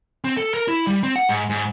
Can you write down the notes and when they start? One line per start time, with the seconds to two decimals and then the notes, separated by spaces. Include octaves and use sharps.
0.24 C4
0.37 A4
0.54 A#4
0.68 E4
0.87 G3
1.03 C4
1.16 F#5
1.28 G#2
1.49 G#2